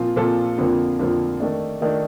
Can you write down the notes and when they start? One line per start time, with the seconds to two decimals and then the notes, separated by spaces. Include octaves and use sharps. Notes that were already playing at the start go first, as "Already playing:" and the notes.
Already playing: A#2 F3 C4 F4
0.16 A#2 F3 C4 F4 A4
0.58 F2 D3 F3 A#3
0.99 F2 D3 F3 A#3
1.40 D#3 A3 D4
1.81 D#3 A3 D4